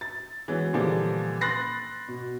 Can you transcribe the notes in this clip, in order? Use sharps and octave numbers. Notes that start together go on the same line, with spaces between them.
A6
E3 F#3 G#3 B3
A#2 D3 E3 F3 G3
B5 C6 F#6 A6 A#6 C7
B2